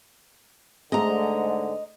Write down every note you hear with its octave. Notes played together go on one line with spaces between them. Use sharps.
G#2 D3 G#3 A3 D#5 A#5